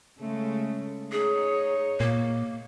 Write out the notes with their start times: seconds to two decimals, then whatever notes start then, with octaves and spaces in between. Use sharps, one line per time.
0.20 C#3 G#3 A3
1.12 D#4 G#4 C#5
2.00 A#2 A#3